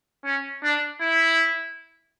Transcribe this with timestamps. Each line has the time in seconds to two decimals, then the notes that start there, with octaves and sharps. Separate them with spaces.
0.25 C#4
0.63 D4
1.01 E4